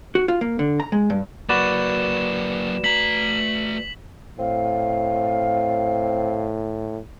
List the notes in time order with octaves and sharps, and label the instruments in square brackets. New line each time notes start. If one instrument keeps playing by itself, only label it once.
[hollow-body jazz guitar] F#4
F4
A#3
D3
A#5
G#3
G2
[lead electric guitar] F#3 A#3 [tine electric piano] F#4 B4 D5 [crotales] E7
[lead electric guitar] A3 A#5 [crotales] B6 F#7
[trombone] A2 [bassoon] C4 [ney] F5